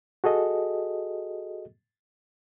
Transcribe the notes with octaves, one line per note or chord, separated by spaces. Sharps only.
F#4 G#4 A4 D#5